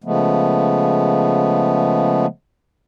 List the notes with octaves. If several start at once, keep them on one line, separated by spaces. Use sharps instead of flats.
C#3 F3 G#3 A3 B3